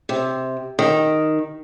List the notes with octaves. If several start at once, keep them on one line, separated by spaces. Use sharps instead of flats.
C3
D#3